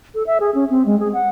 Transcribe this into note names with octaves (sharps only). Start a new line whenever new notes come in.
A4
E5
G#4
C#4
C4
G#3
G#4
F#5